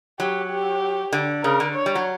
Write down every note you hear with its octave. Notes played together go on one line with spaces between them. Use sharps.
F#3 G4
G4
D3
C#3 A#4
D3
C#5
G3
F#3